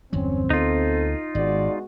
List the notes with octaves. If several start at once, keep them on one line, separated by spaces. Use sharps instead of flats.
G1 E2 F#3 C4 C#4
D2 B3 D#4 F4 A4
G#1 G#3 B3 F#4 D5